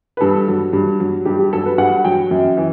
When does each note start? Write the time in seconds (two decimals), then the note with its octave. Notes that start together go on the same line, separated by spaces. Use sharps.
0.17 B4
0.21 G2 A4
0.48 F#3
0.73 G2
1.00 F#3
1.25 G2 G4
1.39 G4
1.53 F#3 A4
1.66 B4
1.78 G2 F#5
2.05 F#3 G5
2.31 F#2
2.57 E3